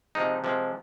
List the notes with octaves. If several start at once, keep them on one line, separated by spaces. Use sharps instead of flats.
C3 F3 G#3 D#4
C3 F3 G#3